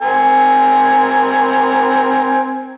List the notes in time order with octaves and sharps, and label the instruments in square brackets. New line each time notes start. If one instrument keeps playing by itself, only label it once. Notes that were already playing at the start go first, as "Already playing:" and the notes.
[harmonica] C4 A#4 G#5